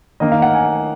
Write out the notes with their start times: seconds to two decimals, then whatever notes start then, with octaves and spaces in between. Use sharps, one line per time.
0.20 D#3 A#3 D#4 D#5
0.32 F5
0.42 F#5
0.54 G#5